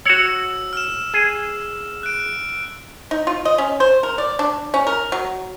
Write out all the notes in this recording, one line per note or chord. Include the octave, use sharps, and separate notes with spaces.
F#4 C#5 E6
F6 E7
G#4
F#6 D7
D#4
F4
D#5
C#4
C5
A#4
D5
D4
C#4
A#4
F#3